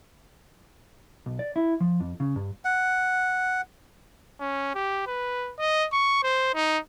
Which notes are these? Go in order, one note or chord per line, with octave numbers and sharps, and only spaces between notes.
B1
D5
E4
F3
F2
C#3
G2
F#5
C#4
G4
B4
D#5
C#6
C5
D#4